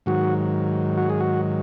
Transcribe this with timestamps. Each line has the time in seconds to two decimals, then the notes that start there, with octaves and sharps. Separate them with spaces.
0.06 G#2 D#3 F#3 F#4
0.98 F#4
1.10 G#4
1.20 F#4